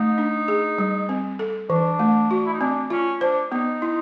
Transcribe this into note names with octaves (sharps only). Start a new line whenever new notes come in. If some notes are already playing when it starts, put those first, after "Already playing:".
Already playing: A3 D#4
D4
G#4
G3
C4
A4
E3 D4
A3
F#4
E4
D#4
C4 D4
C#4 F4
D4 C5
B3 D#4
E4